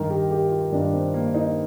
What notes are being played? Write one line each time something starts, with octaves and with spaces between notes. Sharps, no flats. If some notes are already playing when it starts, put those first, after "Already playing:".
Already playing: G2 D#3 A#4
G4
G4
F4
G2 D#3 D4
C4
A#3
D#4